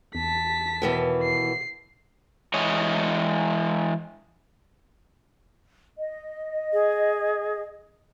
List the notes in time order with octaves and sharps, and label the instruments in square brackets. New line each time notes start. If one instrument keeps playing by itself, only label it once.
[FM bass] E2 [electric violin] A5 B6
[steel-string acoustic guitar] D#2 B2 E3
[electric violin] C7
[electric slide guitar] E3 G#3 C#5 D#5
[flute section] D#5
[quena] G#4